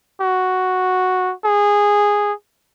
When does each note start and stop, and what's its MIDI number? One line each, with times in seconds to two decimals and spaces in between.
0.21 1.33 66
1.45 2.32 68